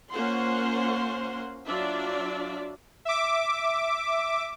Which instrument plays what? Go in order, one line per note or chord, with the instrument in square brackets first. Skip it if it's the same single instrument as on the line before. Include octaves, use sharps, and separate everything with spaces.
[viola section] A#3 C#4 F4 C5 F#5 C6
F#3 D4 F4 D5 E5
[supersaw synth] E5 D6